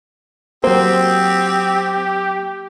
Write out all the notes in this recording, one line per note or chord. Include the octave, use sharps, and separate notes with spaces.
F#3 A#3 C4 G4 C5